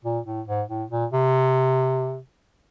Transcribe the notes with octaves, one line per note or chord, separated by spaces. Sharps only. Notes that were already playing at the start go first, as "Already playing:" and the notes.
A#2
A2
G#2
A2
A#2
C3